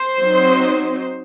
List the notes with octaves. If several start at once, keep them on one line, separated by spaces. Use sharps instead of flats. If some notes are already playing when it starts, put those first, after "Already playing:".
Already playing: C5
F#3 C4 D#4